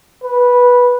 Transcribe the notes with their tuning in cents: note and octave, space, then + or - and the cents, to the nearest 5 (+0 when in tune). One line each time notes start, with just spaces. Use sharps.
B4 -10